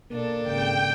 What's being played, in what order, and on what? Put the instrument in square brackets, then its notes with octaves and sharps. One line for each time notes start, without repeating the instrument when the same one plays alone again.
[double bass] B2 [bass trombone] A#3 [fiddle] D4 A4
[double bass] G#1 C#3 [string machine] G5